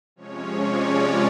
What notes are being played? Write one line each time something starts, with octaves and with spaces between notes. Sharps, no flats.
C3 F3 G#3 C#4 C#5
D5